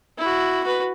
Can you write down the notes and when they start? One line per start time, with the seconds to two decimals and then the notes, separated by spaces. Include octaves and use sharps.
0.18 E4 F#4
0.63 F#4 B4